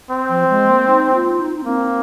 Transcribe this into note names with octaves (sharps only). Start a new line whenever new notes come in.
C4
F3
G#3
A#3
D#4
F4
D#4
D#4
A#3 C4